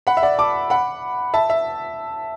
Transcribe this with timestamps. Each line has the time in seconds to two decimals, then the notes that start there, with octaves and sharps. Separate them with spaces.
0.07 F#5 B5
0.17 E5
0.23 D5 F#5
0.39 A5 D6
0.70 F#5 B5
1.34 E5 A5
1.50 E5